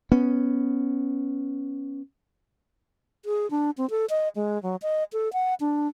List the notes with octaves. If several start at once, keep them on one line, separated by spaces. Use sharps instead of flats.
B3 C#4
G#4
D4
C4
A4
D#5
G#3
F#3
D#5
A4
F#5
D4